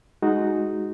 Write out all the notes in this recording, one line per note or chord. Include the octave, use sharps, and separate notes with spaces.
G#3 D#4 F#4